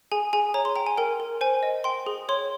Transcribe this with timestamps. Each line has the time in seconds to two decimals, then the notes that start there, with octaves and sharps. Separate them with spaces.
0.12 G#4 G#5
0.33 G#4 G#5
0.54 C#5 A#5
0.65 C6
0.76 G5 A#5
0.86 G#5
0.97 A#4 G5
1.20 A#4
1.41 C5 G#5
1.63 D#5
1.84 G5 C6
2.06 G#4
2.29 C#5 C6